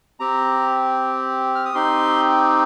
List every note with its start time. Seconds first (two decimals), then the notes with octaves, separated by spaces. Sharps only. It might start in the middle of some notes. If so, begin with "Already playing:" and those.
0.20 C4 G4 A#5
1.55 F6
1.65 D#6
1.74 C4 D#4 G4 C6